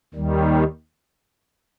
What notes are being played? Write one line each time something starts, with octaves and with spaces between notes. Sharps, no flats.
D#2 D#3 G3